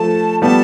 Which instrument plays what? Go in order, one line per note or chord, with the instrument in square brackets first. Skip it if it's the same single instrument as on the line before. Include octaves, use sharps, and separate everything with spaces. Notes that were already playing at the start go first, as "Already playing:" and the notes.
Already playing: [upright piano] F3 A3 [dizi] A5
[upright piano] G3 B3 [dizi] A5